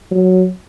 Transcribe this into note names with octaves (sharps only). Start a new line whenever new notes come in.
F#3